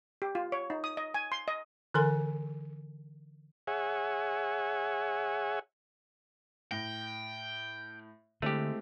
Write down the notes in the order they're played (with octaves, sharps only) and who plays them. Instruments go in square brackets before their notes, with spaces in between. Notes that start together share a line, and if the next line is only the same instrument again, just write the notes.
[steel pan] G4
F4
C#5
D#4
D#6
D#5
G#5
C6
D#5
[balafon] D3 E3 A4 A#4 G#5 C6
[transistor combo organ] G#4 C#5 E5 F#5 G#5
[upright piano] A2 A#6 [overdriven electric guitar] G5
[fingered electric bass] D3 [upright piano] G#3 C4 E4 [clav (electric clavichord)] A3 G4